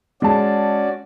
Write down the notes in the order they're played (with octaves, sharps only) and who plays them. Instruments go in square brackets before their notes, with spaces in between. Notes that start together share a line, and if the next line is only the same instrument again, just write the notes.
[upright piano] G#3 A5 [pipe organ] C#4 F#4 D5